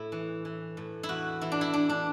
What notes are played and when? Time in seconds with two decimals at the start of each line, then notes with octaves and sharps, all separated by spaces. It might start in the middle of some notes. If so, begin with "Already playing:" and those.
Already playing: A2 E4
0.12 E3
0.45 E3
0.77 A2
1.03 E4
1.09 E2 F#4
1.41 E3 E4
1.52 D4
1.61 E4
1.74 E3 D4
1.89 D4